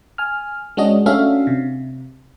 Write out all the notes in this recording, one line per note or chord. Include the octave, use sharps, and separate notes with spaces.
G#5 F6
G#3 C#4 D4 F#4 D#5
A3 C#4 D4 F#4 E5 F5
C3